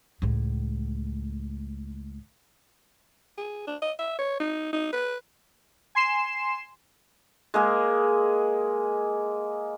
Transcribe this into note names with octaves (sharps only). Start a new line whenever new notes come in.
C#2 A2
G#4
D4
D#5
E5
C#5
D#4
D#4
B4
G#5 C6 C7 E7
G#3 A#3 G#4